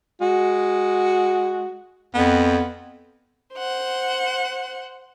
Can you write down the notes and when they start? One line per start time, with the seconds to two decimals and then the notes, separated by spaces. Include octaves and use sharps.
0.21 G#3 F#4
2.15 F2 B3
3.55 C5 F#5